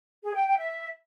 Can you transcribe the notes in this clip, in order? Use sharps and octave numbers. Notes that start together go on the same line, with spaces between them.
G#4
G5
G5
E5